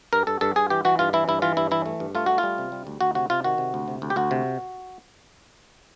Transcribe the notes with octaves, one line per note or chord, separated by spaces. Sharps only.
G2 A#4
G2 A4
G2 A4
G2 G#4
E3 G4
E3 F#4
G2 F4
E3 E4
G2 E4
E3 F4
G2 E4
E3 E4
A3
G2
A3 F4
A3 F#4
F4
G3
C3
G3
D2
D2 F#4
C3 F#4
C3 F4
D#3 F#4
C3
D2
C3
D2
G4
D2 F#4
C3